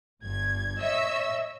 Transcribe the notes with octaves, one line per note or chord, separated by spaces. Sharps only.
G1 G2 G#6
C#5 D#5 E5 E6